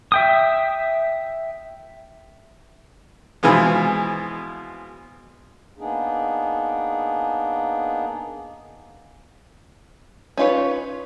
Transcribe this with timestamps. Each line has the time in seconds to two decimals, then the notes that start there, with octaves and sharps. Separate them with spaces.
0.12 E5 G5 D#6
3.43 B2 E3 F3 G#3 B3
5.78 A#3 B3 D4 D#4 G#4
10.37 C#4 D#4 F4 B4 C#5